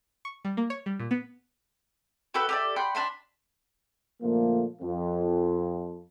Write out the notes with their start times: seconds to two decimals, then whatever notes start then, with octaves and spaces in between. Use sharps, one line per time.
0.25 C#6
0.45 G3
0.57 A#3
0.70 C#5
0.86 G3
1.00 A#2
1.11 B3
2.34 F#4 G4 A4 B4
2.49 G4 A4 D5
2.76 F#5 G5 B5 C6
2.95 D4 A5 B5 C6
4.21 A#2 D3 F3 A3 A#3
4.81 F2